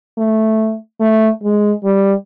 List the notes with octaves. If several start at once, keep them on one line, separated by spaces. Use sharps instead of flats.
A3
A3
G#3
G3